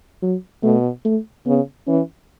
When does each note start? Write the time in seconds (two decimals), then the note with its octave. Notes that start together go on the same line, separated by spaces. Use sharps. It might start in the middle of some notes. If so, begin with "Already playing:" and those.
0.23 F#3
0.63 B2 A3
1.05 A3
1.46 C#3 B3
1.87 E3 C#4